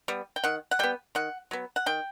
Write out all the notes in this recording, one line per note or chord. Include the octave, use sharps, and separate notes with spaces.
G3 B3
G5
D#3 F#5
F#5
G3 B3 G5
D#3 F#5
F#3 B3
F#5
D#3 G5